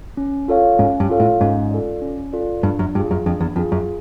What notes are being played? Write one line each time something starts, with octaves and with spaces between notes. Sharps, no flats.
C#4
F4 A4 C#5 F5
G#2 C#4
G2
F4 A4 C#5 F5
A2
G#2 C#4
F4 A4 D5
C#4
F4 A4 D5
G2 D4
F#2
G2 F4 G#4
F#2
F2 D4
E2
F2 F4 G#4
F#2